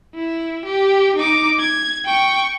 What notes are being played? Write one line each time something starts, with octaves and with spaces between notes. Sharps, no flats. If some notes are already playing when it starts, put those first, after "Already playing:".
E4
G4
D#4 D6
G#6
G5 C#6